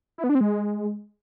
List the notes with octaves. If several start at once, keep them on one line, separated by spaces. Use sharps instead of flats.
E4
B3
D4
C4
G#3